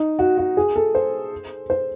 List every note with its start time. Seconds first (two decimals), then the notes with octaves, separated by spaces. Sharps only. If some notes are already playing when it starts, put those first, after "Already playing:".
Already playing: D#4
0.19 F#4
0.38 F#4
0.57 G#4
0.76 A4
0.95 C5
1.70 C5